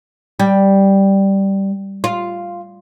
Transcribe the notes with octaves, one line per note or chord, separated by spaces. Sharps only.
G3
F4